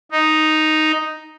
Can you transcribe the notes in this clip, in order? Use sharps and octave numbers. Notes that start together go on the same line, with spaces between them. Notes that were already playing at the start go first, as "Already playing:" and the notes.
D#4